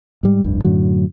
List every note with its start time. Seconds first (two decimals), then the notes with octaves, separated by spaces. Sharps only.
0.23 G#2 G3
0.44 F1 C2 G2
0.65 F#2 A2 D3 F#3